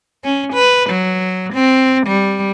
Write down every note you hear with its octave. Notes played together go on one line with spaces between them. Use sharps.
C#4
B4
F#3
C4
G3